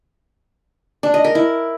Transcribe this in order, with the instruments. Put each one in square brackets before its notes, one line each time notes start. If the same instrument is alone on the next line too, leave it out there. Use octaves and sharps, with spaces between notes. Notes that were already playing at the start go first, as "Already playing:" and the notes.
[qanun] D4
D#5
A#4
E4